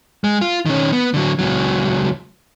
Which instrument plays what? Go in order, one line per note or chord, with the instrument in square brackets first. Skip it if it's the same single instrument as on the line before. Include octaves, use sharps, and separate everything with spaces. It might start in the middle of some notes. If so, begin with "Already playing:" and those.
[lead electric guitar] G#3
F4
D#3 C#4
B3
D3 F#3
C#2 F#3